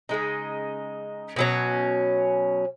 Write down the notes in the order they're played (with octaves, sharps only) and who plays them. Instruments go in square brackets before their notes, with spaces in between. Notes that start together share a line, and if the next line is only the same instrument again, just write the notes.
[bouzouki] C#3 G#3 D#4
B2 F#3 C#4